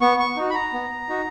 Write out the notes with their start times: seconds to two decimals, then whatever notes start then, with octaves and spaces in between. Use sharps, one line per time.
0.01 B3 C#6
0.19 C#6
0.36 D#4 F#4
0.50 B5
0.55 A#5
0.73 B3
1.09 D#4 F#4